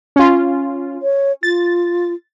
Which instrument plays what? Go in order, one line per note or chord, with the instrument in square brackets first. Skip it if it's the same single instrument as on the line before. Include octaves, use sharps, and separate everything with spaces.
[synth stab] C#4 F4
[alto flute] C#5
[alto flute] F4 [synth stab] A6